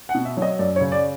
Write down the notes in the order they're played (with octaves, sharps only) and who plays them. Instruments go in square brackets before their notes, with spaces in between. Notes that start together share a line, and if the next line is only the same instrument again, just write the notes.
[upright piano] F#5
B2
E5
F#3
D#5
F#2 D5
C#5
C#3
D5